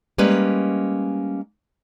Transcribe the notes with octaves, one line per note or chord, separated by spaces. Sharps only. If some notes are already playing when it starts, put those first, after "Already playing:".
G3 G#3 A#3 C#4 B4